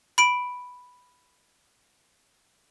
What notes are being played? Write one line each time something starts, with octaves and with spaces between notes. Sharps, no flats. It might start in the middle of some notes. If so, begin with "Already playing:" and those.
B5 D7